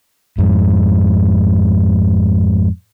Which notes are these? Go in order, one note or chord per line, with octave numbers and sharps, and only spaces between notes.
F2 G#2